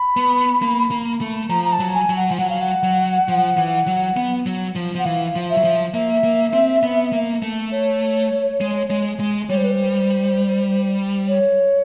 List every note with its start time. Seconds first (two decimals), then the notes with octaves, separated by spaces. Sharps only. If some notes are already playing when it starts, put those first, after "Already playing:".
Already playing: B5
0.17 B3
0.62 A#3
0.91 A#3
1.21 A3
1.50 F3 A#5
1.65 A#5
1.73 A5
1.80 F#3
1.95 G#5
2.10 F#3
2.17 F#5
2.31 F3
2.39 F#3 F#5
2.50 F5
2.61 F#5
2.83 F#3
3.28 F3
3.57 E3
3.87 F#3
4.17 B3
4.46 F#3
4.75 F3
4.95 F3 F#5
5.05 E3 F5
5.36 F3
5.50 E5
5.57 F#3
5.64 F3
5.94 A#3 E5
6.24 A#3
6.53 C4
6.83 B3
7.13 A#3
7.43 A3
7.72 C#5
8.61 G#3
8.90 G#3
9.20 G#3
9.49 G3 C#5
9.57 C5
9.64 B4
9.72 C5
11.28 C#5